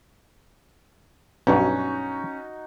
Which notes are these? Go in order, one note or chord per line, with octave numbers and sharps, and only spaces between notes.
B1 G2 C#4 D#4 F#4